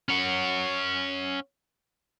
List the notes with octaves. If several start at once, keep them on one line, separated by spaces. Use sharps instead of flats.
C#4 F#5